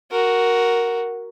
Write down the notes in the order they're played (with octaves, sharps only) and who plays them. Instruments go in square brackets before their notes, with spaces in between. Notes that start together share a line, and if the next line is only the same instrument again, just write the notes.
[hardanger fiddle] F#4 A#4